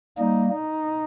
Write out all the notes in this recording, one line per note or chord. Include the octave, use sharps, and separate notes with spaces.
G3 A#3 D#4
D#4